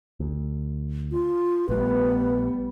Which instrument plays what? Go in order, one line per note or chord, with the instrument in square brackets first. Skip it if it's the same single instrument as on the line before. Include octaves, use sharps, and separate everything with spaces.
[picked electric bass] D2
[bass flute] F4
[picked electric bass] A#1 A3 [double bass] G3 B3 [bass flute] B4